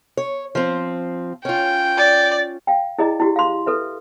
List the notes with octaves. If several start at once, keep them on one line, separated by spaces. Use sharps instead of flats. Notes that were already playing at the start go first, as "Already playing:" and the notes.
C#5
F3 C4
C#4 F4 G5
D5
F5 G5
E4 G#4 D5 D#5 A#5
E4 F#4 G4
F5 C6
A4 B4 E5